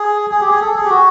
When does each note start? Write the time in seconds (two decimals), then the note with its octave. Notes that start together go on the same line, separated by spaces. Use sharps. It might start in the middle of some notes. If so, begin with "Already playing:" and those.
Already playing: G#4
0.32 G#4
0.41 G4
0.51 G#4
0.61 A4
0.76 G#4
0.85 G4
0.90 F#4